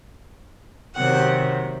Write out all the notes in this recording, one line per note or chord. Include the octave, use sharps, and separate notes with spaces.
C3 D#3 F#3 F#5